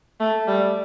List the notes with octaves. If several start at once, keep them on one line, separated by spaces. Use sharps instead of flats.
A3
G3